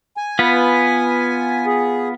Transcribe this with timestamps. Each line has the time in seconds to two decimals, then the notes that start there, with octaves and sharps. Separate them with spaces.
0.17 G#5
0.39 B3 F4 B4
1.66 G#4